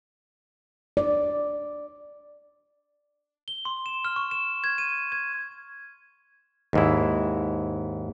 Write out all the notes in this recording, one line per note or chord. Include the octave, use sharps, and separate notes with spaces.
D5
G7
C6
E7
F6
C#6
E7
G#6
D#7
G#6
D#2 G#2 E4